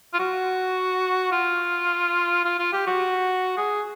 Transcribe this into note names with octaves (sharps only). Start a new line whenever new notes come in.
F4
F#4
F4
F4
F4
G4
F#4
G#4